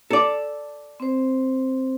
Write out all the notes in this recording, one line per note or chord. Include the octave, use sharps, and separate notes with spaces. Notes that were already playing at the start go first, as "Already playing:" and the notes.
A4 D5
C4 C5